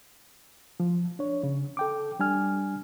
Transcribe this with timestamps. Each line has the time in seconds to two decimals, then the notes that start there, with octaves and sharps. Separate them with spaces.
0.80 F3
1.19 D4 C#5
1.43 C#3
1.77 A4 G5 D6
2.19 G3 D4 G#5 F6